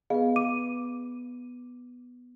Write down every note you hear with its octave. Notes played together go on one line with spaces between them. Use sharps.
B3 G#4 B4 D#5 F5
D6 D#7